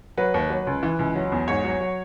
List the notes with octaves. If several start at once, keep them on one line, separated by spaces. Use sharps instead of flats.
F#3 B4
D#2
F#3
C#2
E3
C#2
F#3
E2
G#2 C#5
F#3
F#3